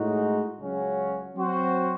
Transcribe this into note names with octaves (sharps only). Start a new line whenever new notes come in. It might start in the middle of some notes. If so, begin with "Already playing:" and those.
Already playing: A2 G#3 D#4 F#4
C#2 C#3 F#3 C#4 F#4
F#3 C4 F#4 C5